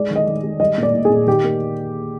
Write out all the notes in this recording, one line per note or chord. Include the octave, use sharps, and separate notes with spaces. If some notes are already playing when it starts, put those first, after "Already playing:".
Already playing: G#3 D5
D#3
D#5
D#3
G#3
G3 D#5
A#2
D5
A#2
G#4
A#2
D#3 G4
A#3